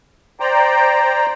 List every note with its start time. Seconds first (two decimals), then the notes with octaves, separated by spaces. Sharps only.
0.40 C5 D5 G5 A#5